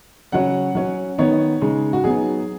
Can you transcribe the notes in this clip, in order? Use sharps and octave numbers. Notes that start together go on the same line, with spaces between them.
C#3 F#3 C#4 F#5
F#3 C#4
D#3 B3 D#4 C#5
C#3 G#3 D#4
F#4
F#3 B3 D#4 G#4